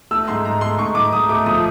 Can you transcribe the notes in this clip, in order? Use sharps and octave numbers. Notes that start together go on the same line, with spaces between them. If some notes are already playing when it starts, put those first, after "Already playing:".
A3 E6
G#2 C6
G#2 A#5
A3 C6
G#2 C#6
G#2 D6
G#2 D#6
A3 D6
F3 D#6